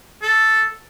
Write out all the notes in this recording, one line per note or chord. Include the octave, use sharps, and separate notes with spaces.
A4